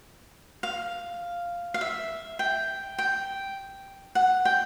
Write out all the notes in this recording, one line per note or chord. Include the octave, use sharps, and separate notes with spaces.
F5
F5
E5
G5
G5
F#5
G5